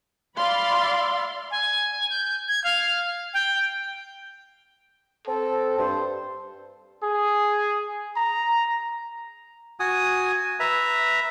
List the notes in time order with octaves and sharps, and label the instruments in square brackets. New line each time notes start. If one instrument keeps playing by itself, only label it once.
[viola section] D5 F5 B5 C6
[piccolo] G#5
G6
G#6
F5
G5
[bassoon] C4 [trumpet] A4
[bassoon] G2 [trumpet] C5
[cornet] G#4
A#5
[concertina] F#4 G#5 D#6
B4 E5 A#5